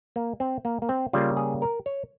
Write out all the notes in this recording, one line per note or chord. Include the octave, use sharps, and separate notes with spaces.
A#3
C4
A#3
A#3
C4
C#3 G3 A#3 F4
G#4
A#4
C#5